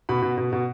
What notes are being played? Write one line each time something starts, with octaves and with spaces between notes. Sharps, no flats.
B2 B5
B2
B2
B2